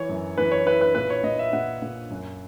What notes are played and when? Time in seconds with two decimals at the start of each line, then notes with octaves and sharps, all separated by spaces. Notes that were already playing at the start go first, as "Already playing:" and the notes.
Already playing: E3 C#5
0.09 F#2
0.38 E3 B4
0.52 C#5
0.66 E4 B4
0.81 B4
0.95 A#2 B4
1.10 C#5
1.24 A#2 D#5
1.39 E5
1.53 A#2 F#5
1.82 A#2
2.10 F#2